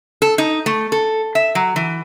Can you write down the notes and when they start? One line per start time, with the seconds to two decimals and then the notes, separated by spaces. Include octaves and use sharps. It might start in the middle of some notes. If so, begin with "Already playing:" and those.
0.22 A4
0.38 D#4
0.66 A3
0.92 A4
1.35 E5
1.55 F#3
1.76 E3